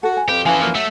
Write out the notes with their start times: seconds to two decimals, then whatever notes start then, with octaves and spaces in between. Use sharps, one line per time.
0.03 F#4 A4
0.17 G#5
0.28 F2 G4 B4
0.46 D#2 E3 F3 C#4 A4 F5 G#5
0.61 F#2 E3 A#3
0.75 F#3 A3 E5